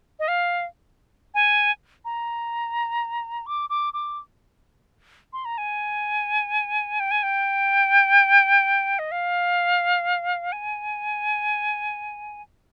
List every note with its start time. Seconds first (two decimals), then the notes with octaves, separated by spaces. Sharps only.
0.19 D#5
0.28 F5
1.34 G#5
2.05 A#5
3.46 D6
3.70 D6
3.93 D6
5.33 C6
5.45 A#5
5.58 G#5
7.00 G5
7.11 G#5
7.23 G5
8.99 D#5
9.11 F5
10.52 G#5